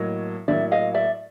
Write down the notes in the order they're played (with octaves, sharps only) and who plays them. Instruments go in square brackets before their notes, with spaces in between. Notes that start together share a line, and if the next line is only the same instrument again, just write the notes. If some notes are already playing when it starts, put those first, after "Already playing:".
Already playing: [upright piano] A2 F#3 A#3 [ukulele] C#5 D#5
[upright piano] A2 F#3 A#3 [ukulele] D5 E5
[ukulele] D#5 F5
D5 E5